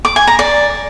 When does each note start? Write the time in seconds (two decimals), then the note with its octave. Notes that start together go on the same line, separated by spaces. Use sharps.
0.05 D6
0.16 G#5
0.27 A#5
0.39 D5